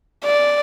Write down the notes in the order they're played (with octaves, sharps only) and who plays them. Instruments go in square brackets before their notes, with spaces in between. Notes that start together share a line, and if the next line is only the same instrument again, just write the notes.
[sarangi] D5